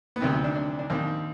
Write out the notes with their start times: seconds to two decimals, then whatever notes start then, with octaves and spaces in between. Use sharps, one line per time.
0.16 B3
0.20 D2 C3 D#3 C4
0.44 D4
0.56 D4
0.79 D4
0.90 D#2 D#3 C4